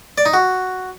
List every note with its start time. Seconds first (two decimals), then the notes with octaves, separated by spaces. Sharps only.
0.18 D5
0.26 D#4
0.33 F#4